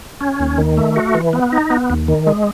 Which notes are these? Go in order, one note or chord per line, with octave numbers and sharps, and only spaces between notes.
C#4
D#2
D#3
A3
F#4
E3
B3
D#4
B3
D#2
D#3
G#3